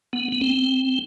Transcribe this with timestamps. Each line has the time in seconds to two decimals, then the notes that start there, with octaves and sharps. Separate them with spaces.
0.13 B3
0.32 B3
0.41 C4